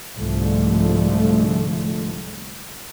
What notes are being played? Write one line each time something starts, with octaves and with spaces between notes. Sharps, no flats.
C2 G#2 D3 F3 A3